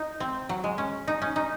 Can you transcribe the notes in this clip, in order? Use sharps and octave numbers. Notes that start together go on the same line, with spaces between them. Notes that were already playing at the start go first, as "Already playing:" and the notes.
Already playing: D#4
C4
F#3
G#3
C#4
D#4
C#4
D#4